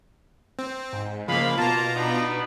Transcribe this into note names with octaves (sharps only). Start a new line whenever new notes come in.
C4
G#2
C#3 F3 G#3 A#3 F5 B5
B2 A#3 F4 A5 A#5
B3 D4 D#4